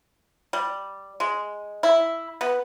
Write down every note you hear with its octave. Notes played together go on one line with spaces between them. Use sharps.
G3
G#3
E4
B3